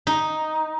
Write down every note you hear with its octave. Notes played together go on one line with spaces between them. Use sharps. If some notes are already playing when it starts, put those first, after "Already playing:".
D#4